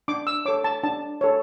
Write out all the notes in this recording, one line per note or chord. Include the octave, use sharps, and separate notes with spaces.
D4 D6
E6
A4 C#5 D6
A5
D4 A5
A4 C#5